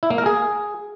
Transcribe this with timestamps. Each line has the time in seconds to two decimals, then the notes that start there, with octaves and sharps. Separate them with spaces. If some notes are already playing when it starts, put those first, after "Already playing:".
0.03 E4
0.10 A#3
0.18 A#4
0.26 G#4